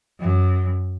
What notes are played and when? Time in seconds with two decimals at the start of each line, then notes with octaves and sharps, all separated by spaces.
0.20 F#2